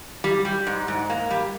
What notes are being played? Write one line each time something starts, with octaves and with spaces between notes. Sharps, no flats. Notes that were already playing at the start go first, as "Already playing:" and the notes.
G3
G3
G#2
G#2
A#3
G3